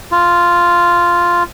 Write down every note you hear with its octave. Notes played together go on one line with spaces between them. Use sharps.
F4